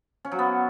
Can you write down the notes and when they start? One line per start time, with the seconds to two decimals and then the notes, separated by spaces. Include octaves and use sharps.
0.25 C#4
0.32 F#3
0.39 B3